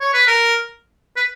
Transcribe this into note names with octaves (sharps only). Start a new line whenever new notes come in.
C#5
B4
A#4
B4